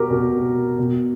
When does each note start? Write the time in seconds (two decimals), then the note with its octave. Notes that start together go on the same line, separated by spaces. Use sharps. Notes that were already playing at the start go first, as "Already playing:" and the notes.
Already playing: B2 F#4 G4 A#4
0.10 B2
0.78 B2